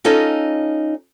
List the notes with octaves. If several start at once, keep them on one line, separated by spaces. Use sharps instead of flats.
C#4 D#4 F4 A4 C#5 D#5